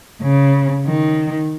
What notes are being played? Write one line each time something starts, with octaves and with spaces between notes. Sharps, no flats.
C#3
D#3